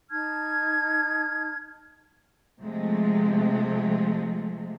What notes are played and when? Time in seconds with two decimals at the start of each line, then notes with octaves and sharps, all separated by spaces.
0.11 D#4 A5 F6 G#6
2.61 C3 F3 G#3 A3